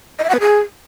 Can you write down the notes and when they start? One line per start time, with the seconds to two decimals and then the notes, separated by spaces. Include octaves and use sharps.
0.19 D#5
0.24 E5
0.29 F#5
0.34 B4
0.40 G#4